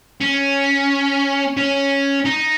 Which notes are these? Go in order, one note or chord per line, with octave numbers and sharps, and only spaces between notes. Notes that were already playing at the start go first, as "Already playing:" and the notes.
C#4
C#4
D#4